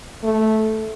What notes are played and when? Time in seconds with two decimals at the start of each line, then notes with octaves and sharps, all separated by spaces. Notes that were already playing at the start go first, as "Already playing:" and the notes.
0.23 A3